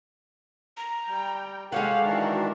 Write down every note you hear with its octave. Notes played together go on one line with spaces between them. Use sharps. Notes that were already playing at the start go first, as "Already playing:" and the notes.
A#5
G3 G5
G#3 G4 A4 C#5 F5 F#5
D#3 E3 D4 F#4 A#4 E5